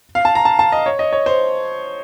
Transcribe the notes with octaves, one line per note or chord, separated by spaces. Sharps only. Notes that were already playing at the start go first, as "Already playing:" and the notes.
F5
A5
A#5
A5
A5
D#5
C#5
D#5
C#5
C5